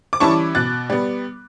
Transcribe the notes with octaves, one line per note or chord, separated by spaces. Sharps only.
D6
E3 G3 C#4 E4 A5 C#6
B2 F#6 A6
G3 B3